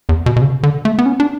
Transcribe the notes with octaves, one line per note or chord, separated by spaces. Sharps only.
E2
B2
B2
C#3
D3
A3
B3
C#4
D4